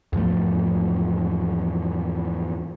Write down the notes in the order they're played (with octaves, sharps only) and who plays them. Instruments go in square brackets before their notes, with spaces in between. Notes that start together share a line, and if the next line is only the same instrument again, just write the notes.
[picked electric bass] E2 G#2 F3 A3